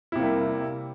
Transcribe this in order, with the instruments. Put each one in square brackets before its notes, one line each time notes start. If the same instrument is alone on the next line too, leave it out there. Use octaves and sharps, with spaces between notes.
[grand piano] E4
C3
A#3
G3